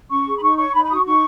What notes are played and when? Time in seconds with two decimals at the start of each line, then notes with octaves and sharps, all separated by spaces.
0.10 C#4 C#6
0.26 G#4
0.37 B5
0.41 D#4 C#6
0.57 C#5 C#6
0.73 D#4 B5
0.84 B5
0.89 F#4 D#6
0.94 C#6
1.05 D#4 C#6